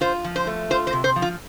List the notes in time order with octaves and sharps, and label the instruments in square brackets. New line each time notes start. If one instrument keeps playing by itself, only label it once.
[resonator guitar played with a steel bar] F4 C5
F3
C5
A3
F4 C5
C5
C3
C5
F3
F4